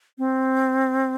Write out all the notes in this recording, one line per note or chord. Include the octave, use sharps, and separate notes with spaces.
C4